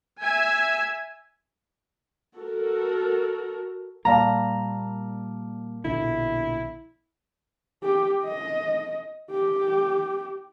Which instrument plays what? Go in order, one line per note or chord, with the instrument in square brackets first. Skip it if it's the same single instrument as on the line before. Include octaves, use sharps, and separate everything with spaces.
[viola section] E5 G#5
F#4 A4 A#4
[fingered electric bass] A#2 G3 A#3 [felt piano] D5 F5 A5 [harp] A#5
[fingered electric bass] A#1 B2 D3 [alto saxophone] E4
[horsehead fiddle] G4
D#5
G4